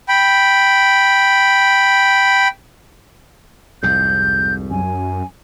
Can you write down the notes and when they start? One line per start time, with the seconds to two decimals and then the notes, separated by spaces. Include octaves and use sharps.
0.09 G5 B5
3.83 C2 F2 G#2 G6
4.71 F#2 G#5